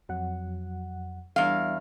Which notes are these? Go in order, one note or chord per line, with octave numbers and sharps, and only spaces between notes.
F2 F#3 F#5
E2 G3 D4 F5